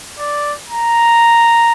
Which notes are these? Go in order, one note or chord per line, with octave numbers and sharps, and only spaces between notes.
D5
A#5